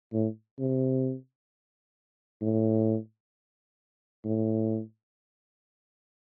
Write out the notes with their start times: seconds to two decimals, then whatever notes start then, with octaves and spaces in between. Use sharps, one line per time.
0.13 A2
0.59 C3
2.42 A2
4.25 A2